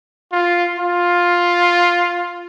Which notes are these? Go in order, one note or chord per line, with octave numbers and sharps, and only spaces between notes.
F4
F4